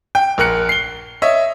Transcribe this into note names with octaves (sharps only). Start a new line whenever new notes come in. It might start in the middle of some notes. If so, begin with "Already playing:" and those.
G5
A#1 A#4 F#6 C#7
C7 G7
C#5 D#5 E5